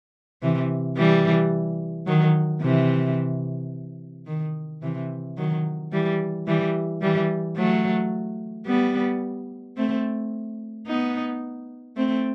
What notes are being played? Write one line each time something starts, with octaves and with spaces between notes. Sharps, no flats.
C3 E3
E3 G3
D#3 F#3
C3 E3
D#3
C3 E3
D#3 F#3
E3 G3
E3 G3
E3 G3
F#3 A3
G3 B3
A3 C4
B3 D#4
A3 C4